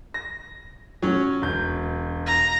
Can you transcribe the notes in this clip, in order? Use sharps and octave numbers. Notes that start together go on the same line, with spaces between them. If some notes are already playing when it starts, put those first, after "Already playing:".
A#6
F#3 C#4
E1 G6
A#5